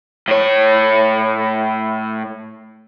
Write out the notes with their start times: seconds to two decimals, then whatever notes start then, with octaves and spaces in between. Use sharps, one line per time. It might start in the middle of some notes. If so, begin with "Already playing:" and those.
0.28 A2 C#5